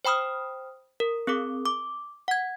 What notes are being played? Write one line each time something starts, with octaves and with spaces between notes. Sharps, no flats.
C5 G5 B5 D#6 F6
A#4
C4 G#4 A#4 D6
D6
F#5 G#6